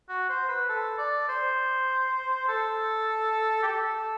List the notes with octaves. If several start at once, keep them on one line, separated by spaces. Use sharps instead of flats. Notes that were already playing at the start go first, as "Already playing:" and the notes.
F#4
C5
B4
A4
D5
C5
A4
G4
A4